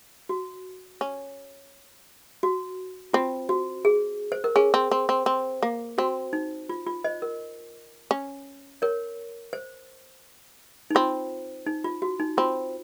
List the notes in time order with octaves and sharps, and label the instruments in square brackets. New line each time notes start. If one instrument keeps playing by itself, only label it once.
[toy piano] F#4
[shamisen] C#4
[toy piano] F#4
[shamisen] C4 [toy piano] F4
[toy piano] F#4
G#4
C5
A#4
[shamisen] C#4 [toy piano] G#4
[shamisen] C4
C4
C4
C4
A#3
[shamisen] C4 [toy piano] F#4
[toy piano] D#4
F4
F4
C5 D#5
A#4
[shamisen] C#4
[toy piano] A#4 C#5
C5
D#4
[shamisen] C4 [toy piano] F4
[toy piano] D#4
F4
F#4
D#4
[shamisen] C4 [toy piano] F4